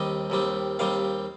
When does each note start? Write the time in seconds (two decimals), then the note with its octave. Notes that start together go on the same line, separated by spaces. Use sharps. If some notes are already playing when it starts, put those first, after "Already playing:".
Already playing: D#2 D#3 G3 C4 D#5
0.30 D#2 D#3 G3 C4
0.79 D#2 D#3 G3 C4 F5